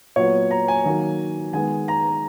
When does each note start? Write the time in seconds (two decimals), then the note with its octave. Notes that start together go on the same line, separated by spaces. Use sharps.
0.16 A#2 F#3 B3 C#5
0.51 A#5
0.68 G#5
0.86 D#3 F#3 A#3
1.53 D#3 G#3 B3 G#5
1.88 A#5